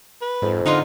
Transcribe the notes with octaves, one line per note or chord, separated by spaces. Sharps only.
B4
F2 G#2
D3 D#4 F4 A#4 F#5